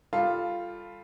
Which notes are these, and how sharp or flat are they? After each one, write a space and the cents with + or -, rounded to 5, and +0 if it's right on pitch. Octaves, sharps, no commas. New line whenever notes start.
G3 +10 F4 +0 A4 +0